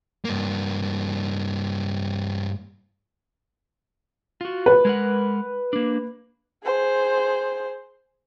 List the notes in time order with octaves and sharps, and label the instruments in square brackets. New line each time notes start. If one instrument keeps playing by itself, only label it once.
[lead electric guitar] G2 A#3
[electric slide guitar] F4 F#4
[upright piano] B4
[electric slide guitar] G#3 A#4 F#5
A#3 D4
[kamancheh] G#4 C5